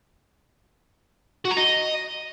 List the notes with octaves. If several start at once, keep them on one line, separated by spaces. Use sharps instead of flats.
F#4
A#5
D#5